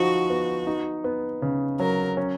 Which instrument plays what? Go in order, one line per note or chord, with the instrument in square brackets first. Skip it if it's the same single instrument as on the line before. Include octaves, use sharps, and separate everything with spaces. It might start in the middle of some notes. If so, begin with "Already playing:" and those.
Already playing: [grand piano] F3 D#4 [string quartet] F#4
[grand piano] B3
D#4
B3
C#3
[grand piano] F#3 [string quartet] A#4
[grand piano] C#4